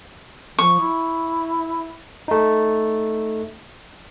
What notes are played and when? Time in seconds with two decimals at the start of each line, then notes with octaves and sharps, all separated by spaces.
0.59 F3 C#6
0.80 E4
2.28 A3 D#4